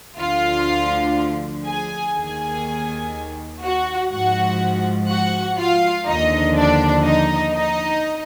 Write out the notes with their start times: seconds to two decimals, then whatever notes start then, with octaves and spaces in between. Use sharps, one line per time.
0.19 D2 D3 F3 F4 F5
1.66 G#4 G#5
2.15 D#2 D#3 G#4 G#5
3.62 F#4 F#5
4.11 G#2 F3 F#4 F#5
5.09 F#4 F#5
5.57 F4 F5
6.06 D#2 D3 F3 D#4 D#5
6.55 D4 D5
7.04 D#4 D#5
7.53 D#4 D#5